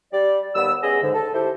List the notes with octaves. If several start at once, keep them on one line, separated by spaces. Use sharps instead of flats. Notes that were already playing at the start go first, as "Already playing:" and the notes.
G3 D5
D#2 G3 B3 E6
B3 C#4 G#4 D#5
G#2 D3
A4
E4 G4 A4 C5